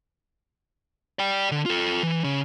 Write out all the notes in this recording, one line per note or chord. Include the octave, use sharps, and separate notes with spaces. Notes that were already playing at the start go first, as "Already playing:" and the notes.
D5 G5
D3
F4 A4
E3
C#3